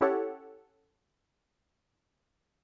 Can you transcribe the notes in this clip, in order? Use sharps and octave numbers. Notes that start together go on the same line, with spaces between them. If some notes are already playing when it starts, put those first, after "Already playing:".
C#4 E4 G4 A4 C#5 F#5